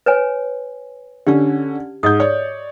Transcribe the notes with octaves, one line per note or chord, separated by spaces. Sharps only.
B4 C#5 G#5
D3 C#4 G4
G#2 D#5 D#6 G6
C#5 D5